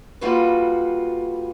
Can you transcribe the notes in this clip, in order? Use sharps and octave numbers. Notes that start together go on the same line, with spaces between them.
G3 A#3 F4 F#4 A4 B4